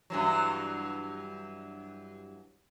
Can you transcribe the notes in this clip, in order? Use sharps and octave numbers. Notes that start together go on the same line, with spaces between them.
G2 E3 F#3